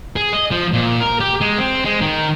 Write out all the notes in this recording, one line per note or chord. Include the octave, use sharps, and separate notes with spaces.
G#4
D#5
F3
A#2
A#4
G4
G#3
C4
G#3
D#3